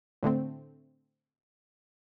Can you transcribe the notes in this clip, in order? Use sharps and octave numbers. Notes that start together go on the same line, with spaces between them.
A2 D3 A3 C4